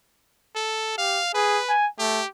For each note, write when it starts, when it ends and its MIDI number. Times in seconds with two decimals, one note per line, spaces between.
0.55 0.95 69
0.98 1.21 67
0.98 1.30 77
1.34 1.60 68
1.34 1.75 71
1.69 1.87 80
1.99 2.21 57
1.99 2.27 67